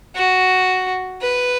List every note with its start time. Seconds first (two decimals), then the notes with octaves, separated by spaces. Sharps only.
0.15 F#4
1.21 B4